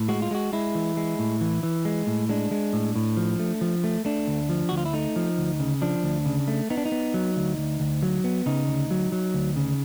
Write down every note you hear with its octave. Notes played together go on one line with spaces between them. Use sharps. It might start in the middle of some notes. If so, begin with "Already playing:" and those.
Already playing: A2
G#3 F#4
F4
G#3 F#4
G#3 E4
E3
G#3
A2
E3
E3
G#3
A2
G#3 D4
G#3
A2
A2
F3
A3
F3
A3
A3 D4
D2
F3
D2 F#4
F4
E4
A3 D#4
F3
D2
C#3
F3 D4
D2
C#3
A3
B3 D#4
D4
D#4
B3
F#3
D2
D2
D2
F#3
B3
C#3 D#4
D2
F#3
F#3
D2
C#3